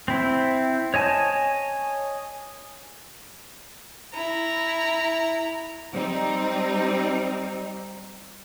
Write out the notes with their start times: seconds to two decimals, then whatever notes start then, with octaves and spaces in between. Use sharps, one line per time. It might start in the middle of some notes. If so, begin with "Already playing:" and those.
0.08 C4 E4
0.94 C#5 D#5 G#5 A5
4.14 E4 A#5
5.93 G3 C4 D#4